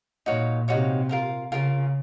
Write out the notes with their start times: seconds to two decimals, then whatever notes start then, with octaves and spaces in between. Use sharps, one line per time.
0.26 A#2 D#4 F#4 C#5 F5
0.68 C3 D#4 F#4 C#5 F5
1.09 F4 A#4 F5 A#5
1.52 C#3 F4 A#4 F5 A#5